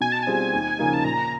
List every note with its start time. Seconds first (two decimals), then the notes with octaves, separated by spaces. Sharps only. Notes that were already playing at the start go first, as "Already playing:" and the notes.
0.01 B2 G#5
0.12 A5
0.23 G3 C4 F4 G#4 G#5
0.53 D#2
0.79 C#3 F3 A#3 D#4
0.94 A5
1.04 A#2 A#5